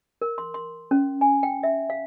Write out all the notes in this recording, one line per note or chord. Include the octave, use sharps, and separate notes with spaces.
A#4
C6
C6
C#4
G#5
G5
E5
F5